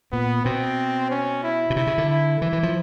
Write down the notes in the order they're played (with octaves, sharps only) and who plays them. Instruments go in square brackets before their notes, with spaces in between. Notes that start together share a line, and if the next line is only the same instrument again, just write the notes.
[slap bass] A#2 [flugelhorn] B3
[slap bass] B2 [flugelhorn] C4
[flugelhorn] C#4
E4
[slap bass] B2
[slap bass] C3 [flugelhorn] E4
[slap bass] C#3
D3
[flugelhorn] E4
[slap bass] E3 [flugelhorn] E4
[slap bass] E3
F3